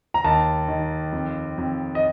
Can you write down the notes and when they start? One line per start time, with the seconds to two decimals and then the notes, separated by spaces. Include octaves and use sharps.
0.14 A#5
0.24 D#2 A5
0.68 D#3
1.13 F2
1.58 F2
1.95 D#5